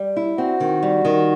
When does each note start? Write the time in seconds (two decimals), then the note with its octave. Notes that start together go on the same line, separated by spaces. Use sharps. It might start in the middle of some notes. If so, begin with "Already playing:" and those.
Already playing: G3
0.16 E4
0.38 C4 F#4
0.60 D#3
0.83 G3
1.05 D#3